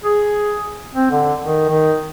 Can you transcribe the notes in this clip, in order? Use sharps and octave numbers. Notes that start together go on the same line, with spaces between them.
G#4
C4
D3
D#3
D#3